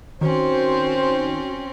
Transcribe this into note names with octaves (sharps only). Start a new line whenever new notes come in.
D#3 C4 C#4 F#4 C5